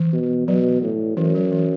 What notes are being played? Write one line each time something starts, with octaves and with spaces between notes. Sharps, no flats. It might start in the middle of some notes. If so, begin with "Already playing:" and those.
Already playing: E3
B2
B2 F#3
A2
F#2 E3
F#3
E3